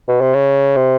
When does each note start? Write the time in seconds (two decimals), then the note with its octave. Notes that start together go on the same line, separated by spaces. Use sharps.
0.08 B2
0.21 C3
0.34 C#3
0.76 C3